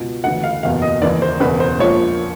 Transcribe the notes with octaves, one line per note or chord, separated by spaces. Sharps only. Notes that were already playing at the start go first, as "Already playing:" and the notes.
Already playing: C#2 B2
D2 C#3 E3 F#5
F5
F#1 E2 B2 F5
D#5
D#2 C#3 E3 D5
C5
E1 E2 C#3 B4
C5
A#1 A#2 F3 C#5